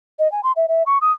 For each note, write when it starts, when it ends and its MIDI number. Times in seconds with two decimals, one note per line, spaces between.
0.19 0.30 75
0.32 0.41 80
0.43 0.52 84
0.56 0.66 76
0.68 0.83 76
0.86 0.98 85
1.01 1.12 87